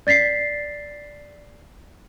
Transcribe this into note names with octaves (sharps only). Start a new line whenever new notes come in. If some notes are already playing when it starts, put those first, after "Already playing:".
D5 A6 B6 C7